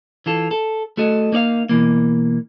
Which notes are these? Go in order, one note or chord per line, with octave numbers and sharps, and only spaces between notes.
E3 F4 A4
A4
A3 F#4 A4 D#5
A#3 D#4 D5 F5
B2 E3 A#3